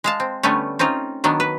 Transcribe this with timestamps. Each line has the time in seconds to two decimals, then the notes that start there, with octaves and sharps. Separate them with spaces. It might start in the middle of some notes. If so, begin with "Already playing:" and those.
0.04 G#3 F5 A5
0.20 C4
0.43 D3 G3 A3 B3 C#4
0.79 C4 C#4 D#4 F4
1.24 D#3 F#3 B3 D4
1.40 B4